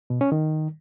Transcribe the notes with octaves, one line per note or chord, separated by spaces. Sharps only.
B2
C#4
D#3